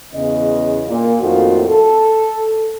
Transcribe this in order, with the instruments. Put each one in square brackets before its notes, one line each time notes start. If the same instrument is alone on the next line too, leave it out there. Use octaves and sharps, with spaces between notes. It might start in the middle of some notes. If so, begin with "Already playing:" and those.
[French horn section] E2 C#3 B3 D#5
A#2
F2 A2 D#3 A#3 F4 F#4
A4